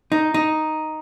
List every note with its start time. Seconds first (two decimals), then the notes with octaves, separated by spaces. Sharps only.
0.12 D#4
0.34 D#4